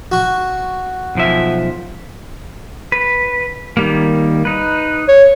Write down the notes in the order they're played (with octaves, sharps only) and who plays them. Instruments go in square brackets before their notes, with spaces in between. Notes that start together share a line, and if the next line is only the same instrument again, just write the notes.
[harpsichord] F#4 C#6
[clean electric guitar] B1 F3 E5
[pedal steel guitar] B4
D#3 G3 A#3
D#4 B4
[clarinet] C#5